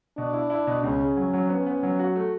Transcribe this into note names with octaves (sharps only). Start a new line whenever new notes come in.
B2 D4
E4
E4
B2
C#2 C#4
C#3
F#3
F#3
B3 C#4
B3
F#3
F#4
A3